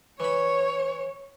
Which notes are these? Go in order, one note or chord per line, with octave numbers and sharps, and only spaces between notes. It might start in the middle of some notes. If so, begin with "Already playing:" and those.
E3 C#5 B5